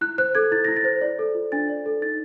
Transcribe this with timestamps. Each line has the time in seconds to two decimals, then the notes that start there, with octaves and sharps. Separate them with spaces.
0.01 E4 F#6
0.18 C5 F#6
0.35 A4 G#6
0.51 E4 A6
0.65 A#6
0.68 E4
0.76 A6
0.85 C5
1.01 D5
1.19 A4
1.35 F4
1.52 D4 A6
1.69 D5
1.86 A4
2.02 D#4 A6